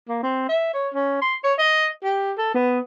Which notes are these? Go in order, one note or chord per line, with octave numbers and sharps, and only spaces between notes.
A#3
C4
E5
C#5
C#4
C6
C#5
D#5
G4
A4
B3